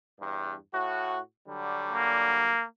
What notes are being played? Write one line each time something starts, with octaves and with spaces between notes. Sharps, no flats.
E2 G2
A2 F#4
D3 F#3 G3
A#3